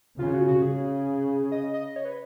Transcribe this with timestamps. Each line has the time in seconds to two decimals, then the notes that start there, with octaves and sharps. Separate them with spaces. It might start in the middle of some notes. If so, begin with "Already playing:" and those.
0.19 C#3 F4
0.33 F#4
0.48 F#4
0.62 C#3 G#4
1.52 D#5
1.74 D#5
1.96 C#5
2.05 B4